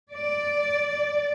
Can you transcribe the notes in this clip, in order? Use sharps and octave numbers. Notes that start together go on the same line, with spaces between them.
D5